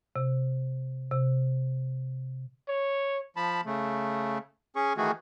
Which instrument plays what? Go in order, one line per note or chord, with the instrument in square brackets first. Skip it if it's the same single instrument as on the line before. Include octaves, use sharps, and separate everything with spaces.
[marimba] C3
C3
[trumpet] C#5
[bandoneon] F3 A5 B5
C#3 A3
C#4 G#4 C#6
D#3 E3 A3 F#4 G#4